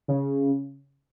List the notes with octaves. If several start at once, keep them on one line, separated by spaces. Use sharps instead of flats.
C#3